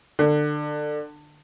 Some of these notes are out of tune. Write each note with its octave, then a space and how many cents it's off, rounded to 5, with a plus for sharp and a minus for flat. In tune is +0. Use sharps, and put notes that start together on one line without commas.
D3 +25